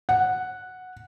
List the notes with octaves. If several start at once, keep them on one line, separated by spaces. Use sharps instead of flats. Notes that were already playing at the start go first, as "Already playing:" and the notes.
F#5